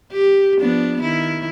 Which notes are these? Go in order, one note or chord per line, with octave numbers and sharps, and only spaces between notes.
G4
F3 B3 D4
D#3 E4